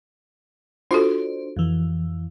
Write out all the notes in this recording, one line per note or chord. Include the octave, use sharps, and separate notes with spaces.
D4 F4 F#4 A4 C5
F2 E3